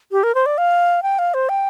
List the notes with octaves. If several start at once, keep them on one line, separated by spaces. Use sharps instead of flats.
G4
A#4
C5
D5
F5
G5
F5
C5
G5